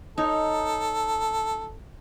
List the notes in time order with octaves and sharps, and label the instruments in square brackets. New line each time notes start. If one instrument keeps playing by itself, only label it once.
[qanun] D#4 C#5 [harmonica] A4